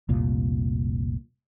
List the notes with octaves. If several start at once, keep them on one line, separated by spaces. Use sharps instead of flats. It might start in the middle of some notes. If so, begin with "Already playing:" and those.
F1 C2 A#2